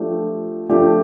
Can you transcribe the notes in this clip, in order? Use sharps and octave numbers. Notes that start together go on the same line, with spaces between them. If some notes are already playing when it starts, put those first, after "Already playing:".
Already playing: F3 A3 D4 G4
F3 A3 D4 G4